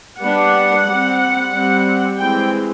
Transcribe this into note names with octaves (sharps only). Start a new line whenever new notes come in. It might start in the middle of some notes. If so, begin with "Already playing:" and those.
G3 B3 D4 F#5
G3 C4
G3 C4
E3 G#3 C4 G5